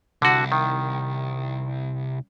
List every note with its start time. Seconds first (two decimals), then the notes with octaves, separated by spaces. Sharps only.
0.22 C2 D3 F#4
0.52 D#3